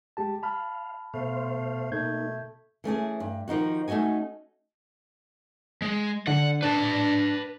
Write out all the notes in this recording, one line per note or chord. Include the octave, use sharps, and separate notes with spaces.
G#3 G4 A5
F5 A5 B5 F6
B2 A3 C5 F5
B2 A3 A#3 D#4 G6 G#6
E3 A3 C#4 G#4
G2
D#3 F3 D#4 F#4
A3 C#4 D#4 F#4 G#5
G#3
D3 F#5
D4 B4 A5